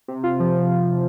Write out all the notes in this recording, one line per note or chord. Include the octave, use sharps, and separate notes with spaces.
C3
F4
F3